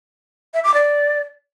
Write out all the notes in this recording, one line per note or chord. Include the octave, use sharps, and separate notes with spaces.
E5
D6
D5